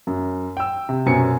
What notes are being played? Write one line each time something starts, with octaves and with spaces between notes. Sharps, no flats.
F#2
G5 E6
C3
F#2 B2 C5 G#5 C#7